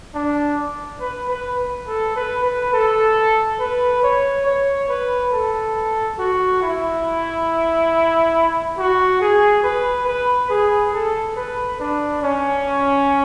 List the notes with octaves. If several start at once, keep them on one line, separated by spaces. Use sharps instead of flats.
D4
B4
B4
A4
B4
B4
A4
B4
C#5
C#5
B4
A4
F#4
E4
F#4
G#4
B4
B4
G#4
A4
B4
D4
C#4